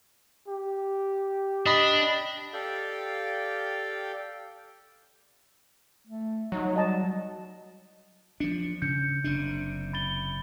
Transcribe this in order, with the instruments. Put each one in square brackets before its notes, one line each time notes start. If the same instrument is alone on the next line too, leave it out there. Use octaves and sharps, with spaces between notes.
[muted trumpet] G4
[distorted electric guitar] D4 [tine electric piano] D#5 B5
[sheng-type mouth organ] G4 A4 D5 F5 G5
[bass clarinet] A3
[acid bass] F#3 [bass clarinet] D#4
[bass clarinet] G3 [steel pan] D#5 A5
[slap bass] F3 D4 [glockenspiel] C#7
[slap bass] C#3 [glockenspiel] G6 C#7
[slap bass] F#1 C3 D4
[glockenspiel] B5 A6 G7